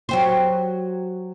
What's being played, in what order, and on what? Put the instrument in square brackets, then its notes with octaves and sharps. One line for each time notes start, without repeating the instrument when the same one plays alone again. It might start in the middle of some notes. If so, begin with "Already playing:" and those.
[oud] F#3 G4 C5